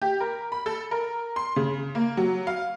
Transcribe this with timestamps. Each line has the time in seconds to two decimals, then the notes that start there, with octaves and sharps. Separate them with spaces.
0.02 G4
0.20 A#4
0.52 B5
0.66 A4
0.91 A#4
1.36 C6
1.56 C#3
1.95 A#3
2.17 F#3
2.47 F5